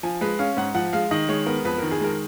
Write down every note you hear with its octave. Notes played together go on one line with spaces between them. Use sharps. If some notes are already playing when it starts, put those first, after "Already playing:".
F3 G#5
G#3 B4
C#4 F5
G#2 F#5
F3 F#5
G#3 F5
D#3 D#5
G#3 C#5
B3 A#4
F2 B4
D#3 A#4
G#4
G#3 A#4